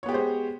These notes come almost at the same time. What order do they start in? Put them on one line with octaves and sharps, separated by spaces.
C#5 B3 G4 G#3 C5